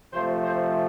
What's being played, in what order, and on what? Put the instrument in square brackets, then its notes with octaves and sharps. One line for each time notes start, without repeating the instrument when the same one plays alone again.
[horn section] C3 F3 A3 C5
C5